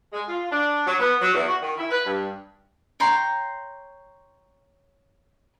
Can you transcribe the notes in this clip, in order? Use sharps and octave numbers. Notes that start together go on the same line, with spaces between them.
G#3
F4
D4
F#3
B3
F#3
E2
F#4
D#3
E4
B4
G2
C#5 G5 A#5 C6